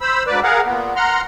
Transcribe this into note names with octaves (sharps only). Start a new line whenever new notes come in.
C5 B5 E6
D2 G#2 B4 D5
G#4 A#4 F5 F#5
A#2 B3
F#5 A#5 C6 F6